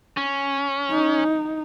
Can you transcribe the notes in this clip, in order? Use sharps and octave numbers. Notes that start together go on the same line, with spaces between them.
C#4
D#4